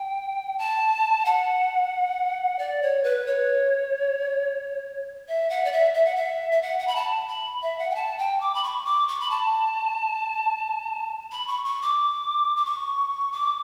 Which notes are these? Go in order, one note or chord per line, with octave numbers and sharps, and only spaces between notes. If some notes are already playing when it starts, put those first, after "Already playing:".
Already playing: G5
A5
F#5
D5
C#5
B4
C#5
E5
F#5
D5
E5
E5
F#5
E5
E5
F#5
F#5
B5
A5
B5
E5
F#5
G5
A5
G5
D6
B5
C#6
D6
C#6
B5
A5
B5
C#6
C#6
D6
D6
C#6
D6